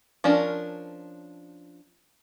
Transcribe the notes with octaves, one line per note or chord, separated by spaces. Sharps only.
F3 C#4 D4 A#4